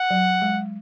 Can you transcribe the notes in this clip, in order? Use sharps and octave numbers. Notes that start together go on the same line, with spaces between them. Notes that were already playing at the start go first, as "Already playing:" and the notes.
Already playing: F#5
F#3
G#3